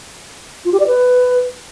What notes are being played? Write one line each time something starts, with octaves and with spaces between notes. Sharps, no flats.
F4
G4
D5
B4